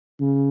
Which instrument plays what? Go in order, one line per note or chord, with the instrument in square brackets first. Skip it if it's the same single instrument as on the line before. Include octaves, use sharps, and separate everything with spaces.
[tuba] C#3